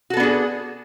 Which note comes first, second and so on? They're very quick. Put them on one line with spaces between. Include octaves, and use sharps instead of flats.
F#4 A4 B3 D4 G#4